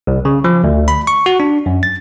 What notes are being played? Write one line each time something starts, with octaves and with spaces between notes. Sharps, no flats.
C2
C#3
F3
D2
B5
C#6
F#4
D4
F#2
A6